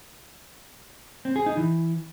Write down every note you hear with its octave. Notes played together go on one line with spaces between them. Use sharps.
C4
G#4
D#4
E3